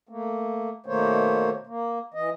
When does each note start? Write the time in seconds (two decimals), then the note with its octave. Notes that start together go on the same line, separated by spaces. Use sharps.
0.09 A3 A#3
0.86 B2 D#3 A3 A#3 C5 C#5
1.67 A#3
2.14 E3 D#5